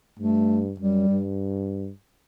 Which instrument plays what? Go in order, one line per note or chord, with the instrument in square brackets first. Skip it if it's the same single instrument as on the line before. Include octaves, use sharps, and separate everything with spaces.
[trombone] G2 [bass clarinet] A3
[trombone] F#2 [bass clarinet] G3
[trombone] G2